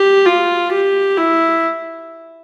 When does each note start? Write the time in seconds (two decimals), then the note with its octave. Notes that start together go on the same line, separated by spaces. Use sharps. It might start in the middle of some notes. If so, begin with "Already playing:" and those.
Already playing: G4
0.25 F4
0.72 G4
1.17 E4